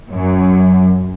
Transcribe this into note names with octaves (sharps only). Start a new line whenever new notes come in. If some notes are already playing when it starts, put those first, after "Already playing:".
F#2